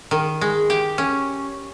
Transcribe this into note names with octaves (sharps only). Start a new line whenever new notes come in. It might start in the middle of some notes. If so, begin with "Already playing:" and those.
D#3
G#3
G4
C#4